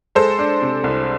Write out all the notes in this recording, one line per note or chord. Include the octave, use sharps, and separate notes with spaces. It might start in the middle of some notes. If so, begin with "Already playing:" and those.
G#3 A4 C5
D4
C3
C2